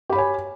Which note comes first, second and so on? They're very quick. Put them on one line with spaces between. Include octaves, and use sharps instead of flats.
G4 B5 C#5 G#5